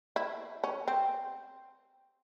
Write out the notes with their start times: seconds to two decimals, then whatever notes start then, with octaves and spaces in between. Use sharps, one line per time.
0.16 E4
0.64 C#4
0.88 C4